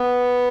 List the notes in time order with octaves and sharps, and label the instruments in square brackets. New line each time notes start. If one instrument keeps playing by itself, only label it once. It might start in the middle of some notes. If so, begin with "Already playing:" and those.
Already playing: [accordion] B3